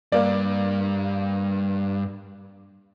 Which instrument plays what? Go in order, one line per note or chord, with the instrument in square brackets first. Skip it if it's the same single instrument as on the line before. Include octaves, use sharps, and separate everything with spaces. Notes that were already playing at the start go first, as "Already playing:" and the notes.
[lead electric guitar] G2 [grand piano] A#3 D5